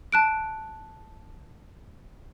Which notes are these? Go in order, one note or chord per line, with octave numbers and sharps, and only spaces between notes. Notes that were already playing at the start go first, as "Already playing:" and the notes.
A5 F#6 D7